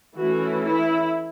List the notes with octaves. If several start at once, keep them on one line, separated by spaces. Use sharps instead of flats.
E3 A3 C#4 F#4
E4